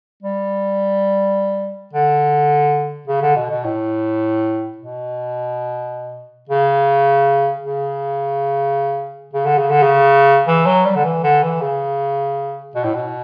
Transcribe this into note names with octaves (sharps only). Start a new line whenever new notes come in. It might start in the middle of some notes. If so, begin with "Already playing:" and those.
G3
D3
C#3
D3
B2
B2
A2
B2
C#3
C#3
C#3
D3
C#3
D3
C#3
E3
F#3
G3
D3
E3
D3
E3
C#3
B2
A2
B2